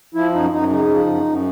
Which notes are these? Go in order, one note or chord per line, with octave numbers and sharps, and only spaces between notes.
F3 E4
F#2 D#4
F#2 D#4
C#3 D#4
F3
F#2
F#2